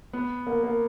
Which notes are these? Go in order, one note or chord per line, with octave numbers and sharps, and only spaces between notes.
B3
A#3
A#3